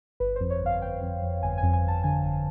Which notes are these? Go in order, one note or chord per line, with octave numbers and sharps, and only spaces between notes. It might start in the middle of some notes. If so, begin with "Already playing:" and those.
G1 B4
F2 C5
C#5
G1 F5
G1 G5
F2
F2
G1 G#5
G#5
F2
G#5
G1 A5
D3 G#5
G1